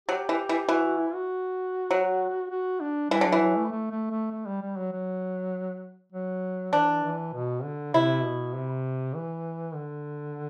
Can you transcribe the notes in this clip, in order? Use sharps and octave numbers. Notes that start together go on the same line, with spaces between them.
F#3 G4
E3
E3
E3 F#4
F#4
E4
F#4
F#3
F#4
D4
E3 G3
D3 F#3
E3
F#3
A3
A3
A3
A3
A3
G3
G3
F#3
F#3
F#3
E3 D4
E3
B2
D3
C3 E4
B2
C3
E3
D3